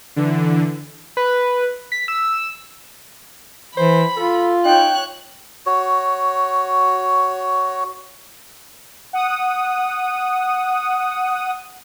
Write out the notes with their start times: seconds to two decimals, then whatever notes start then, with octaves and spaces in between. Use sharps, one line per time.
0.16 D3 E3
1.17 B4
1.92 B6
2.08 E6
3.77 E3 C5 B5
4.17 F4 A4
4.65 D#4 C#5 G5 F#6
5.66 F#4 C#5
9.13 F#5 D#6